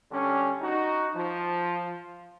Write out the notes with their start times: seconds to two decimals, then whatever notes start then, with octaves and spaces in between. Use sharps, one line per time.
0.11 D3 G3 C#4
0.61 D#4 F#4
1.15 F3